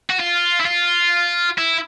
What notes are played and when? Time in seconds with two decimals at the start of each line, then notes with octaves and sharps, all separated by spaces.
0.10 F#4
0.20 F4
0.60 E4
0.66 F4
1.58 E4